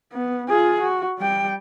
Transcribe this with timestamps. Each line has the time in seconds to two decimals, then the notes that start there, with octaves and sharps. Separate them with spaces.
0.13 B3
0.48 F4 G#4
0.81 F#4
1.19 G3 G5